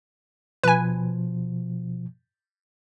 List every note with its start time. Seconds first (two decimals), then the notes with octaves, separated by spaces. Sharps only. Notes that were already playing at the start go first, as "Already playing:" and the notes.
0.64 B2 F3 B4 G#5